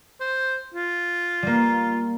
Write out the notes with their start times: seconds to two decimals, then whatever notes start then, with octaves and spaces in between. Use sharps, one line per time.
0.20 C5
0.74 F4
1.43 G3 A#3